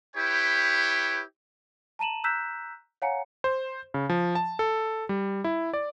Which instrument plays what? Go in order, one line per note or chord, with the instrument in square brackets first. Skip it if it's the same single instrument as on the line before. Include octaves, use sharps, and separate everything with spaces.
[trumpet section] E4 G4 B4 C#5 G5
[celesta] A5 A#5 D#7 E7 F#7
A#5 E6 F#6 G6 B6 E7
C#5 F5 F#5 G#5 A#5 C#7
[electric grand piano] C5
C#3
F3
A5
A4
G3
E4
D5